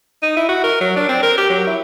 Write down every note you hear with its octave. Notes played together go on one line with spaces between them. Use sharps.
D#4
E4
F#4
A#4
F#3
D4
C4
A#4
G4
F#3
E4